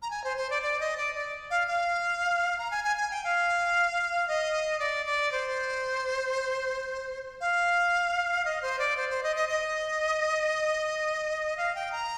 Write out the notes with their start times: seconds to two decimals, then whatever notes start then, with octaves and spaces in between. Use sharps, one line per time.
0.02 A#5
0.10 G#5
0.24 C5
0.37 C5
0.50 D5
0.62 D5
0.80 D#5
0.97 D5
1.15 D5
1.50 F5
1.67 F5
2.59 A#5
2.71 G#5
2.84 G#5
2.97 G#5
3.11 G5
3.24 F5
4.28 D#5
4.79 D5
5.06 D5
5.32 C5
7.41 F5
8.45 D#5
8.62 C5
8.79 D5
8.97 C5
9.10 C5
9.23 D#5
9.36 D#5
9.49 D#5
11.57 F5
11.75 G5
11.92 A#5